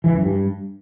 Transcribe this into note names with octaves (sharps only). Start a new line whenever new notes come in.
E3
F#2
G2